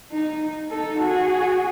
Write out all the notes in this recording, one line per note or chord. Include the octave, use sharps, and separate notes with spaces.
D#4
D#4 A4
F#4 G#4